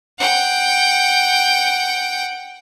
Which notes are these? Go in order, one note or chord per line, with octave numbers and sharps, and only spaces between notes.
F#5 G5